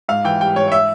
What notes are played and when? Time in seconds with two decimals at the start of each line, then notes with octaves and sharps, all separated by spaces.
0.09 G#2 F5
0.24 E3 G5
0.40 G3 G5
0.56 G#2 C#5
0.68 C#5
0.72 E5